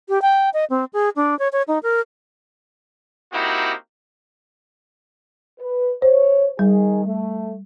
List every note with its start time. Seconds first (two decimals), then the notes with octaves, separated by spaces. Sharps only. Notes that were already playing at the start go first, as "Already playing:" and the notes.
0.09 G4
0.22 G5
0.54 D#5
0.70 C4
0.93 G#4
1.16 D4
1.39 C#5
1.53 C#5
1.68 D#4
1.83 A#4
3.33 A#3 C4 D#4 E4 F#4 G4
5.59 B4
6.02 C5 C#5
6.59 D#3 G3 D#4 G#4
7.04 A3